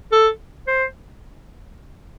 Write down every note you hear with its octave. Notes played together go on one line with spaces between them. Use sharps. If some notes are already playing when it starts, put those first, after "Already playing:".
A4
C5